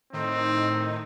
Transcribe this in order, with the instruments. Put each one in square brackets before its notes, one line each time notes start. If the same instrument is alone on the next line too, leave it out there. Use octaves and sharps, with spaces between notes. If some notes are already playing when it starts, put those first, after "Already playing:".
[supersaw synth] A2 D#3 D#4 [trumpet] C4